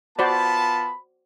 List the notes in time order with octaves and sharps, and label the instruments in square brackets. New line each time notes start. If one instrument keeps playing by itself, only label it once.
[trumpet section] B3 F4 A5 [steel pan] F#4 C5 D5 [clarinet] B5